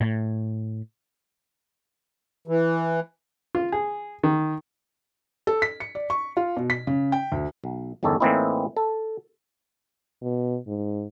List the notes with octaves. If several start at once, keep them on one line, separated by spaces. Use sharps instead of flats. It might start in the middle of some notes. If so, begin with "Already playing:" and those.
A2
E3
F4
G#4
D#3
A4
B6
C#7
D5
C#6
F4
B2
B6
C#3
G5
D2
B1
G1 E2 D#3 C#4 A4
A2 E3 A#3 C4 D#4 E4
A4
B2
G#2